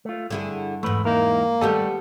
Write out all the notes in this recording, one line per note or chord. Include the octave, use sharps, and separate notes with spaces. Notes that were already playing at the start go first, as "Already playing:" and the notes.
A3 F4
G2 D3 E4 G#4
E2 G#2 A3 B4
A#3 D#4 E4 A#4
D#2 G3 A3 B3 G4 A4 D#5